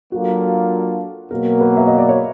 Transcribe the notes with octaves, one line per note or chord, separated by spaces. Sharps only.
F#3 A#3 D4 F4 F#4 A4
B2 F#3 A#3 A#4
B4
E5
D#5
D5
C#5